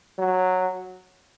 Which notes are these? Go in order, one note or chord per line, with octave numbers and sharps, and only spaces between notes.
F#3